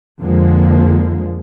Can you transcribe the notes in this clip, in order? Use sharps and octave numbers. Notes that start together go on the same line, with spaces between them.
F2 D3 F3 G#3 A#3